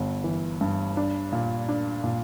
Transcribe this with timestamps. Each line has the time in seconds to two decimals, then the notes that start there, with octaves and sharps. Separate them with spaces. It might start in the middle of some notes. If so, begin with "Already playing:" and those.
Already playing: G1 G2
0.24 E3
0.61 G2
0.97 D4
1.32 A#2
1.69 D4
2.04 A#2